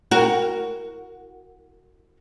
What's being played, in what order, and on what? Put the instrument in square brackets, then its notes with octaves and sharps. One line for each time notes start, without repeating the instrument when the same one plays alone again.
[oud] F#4 A#4